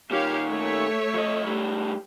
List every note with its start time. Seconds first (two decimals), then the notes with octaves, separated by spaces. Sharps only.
0.11 A#2 D#3 G4 C#5 F5
0.47 A3 C#5 E5
1.14 F3 D#5
1.46 A2 G3